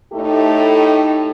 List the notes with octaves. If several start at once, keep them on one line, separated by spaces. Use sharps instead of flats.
A2 A3 D#4 E4 G4 A4